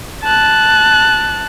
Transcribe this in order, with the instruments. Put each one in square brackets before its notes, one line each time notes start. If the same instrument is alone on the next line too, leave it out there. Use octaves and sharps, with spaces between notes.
[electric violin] A5 F#6